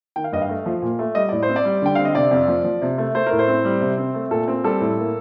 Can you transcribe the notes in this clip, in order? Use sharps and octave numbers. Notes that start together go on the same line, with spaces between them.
D#3 G5
F5
G2 D#5
F5
A3
F3
A#2
A3
G3 D#5
A2 D5
C5
C4
D5
G3
D3 G5
C4 F5
D#5
C3 D5
F2
F3
F3
C3
A3
A3 C5
A#4
A2
C5
C4
G3
C3
C4
A3
A#2 A4
C4
G3 A4
A2
A#3